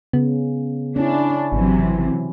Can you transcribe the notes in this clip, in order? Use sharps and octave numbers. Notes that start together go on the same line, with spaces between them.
C#3 B3
C#4 D4 E4
G#1 C3 E3 F#3